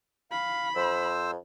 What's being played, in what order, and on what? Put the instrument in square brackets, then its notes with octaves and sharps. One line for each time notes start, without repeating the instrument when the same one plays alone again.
[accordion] F5 [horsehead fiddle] B5
[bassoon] F2 [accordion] C5 E6